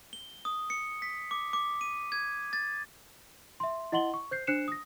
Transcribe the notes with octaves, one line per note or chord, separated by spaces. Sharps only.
G7
D#6
C#7
B6
D6
D6
D#7
G#6
A6
E5 C6
E4 D#5 F#5 C6 F#7 G7
C#6
C5 G6 C7
D4 C5 F#6 C7 C#7 E7
D#6 A#6